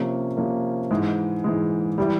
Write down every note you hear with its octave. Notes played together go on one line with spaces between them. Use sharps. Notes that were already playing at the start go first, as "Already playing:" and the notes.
Already playing: C3 F3 A#3 C#4
C3 F3 A#3 C#4
G#2 E3 G#3
G#2 E3 G#3
E3 G3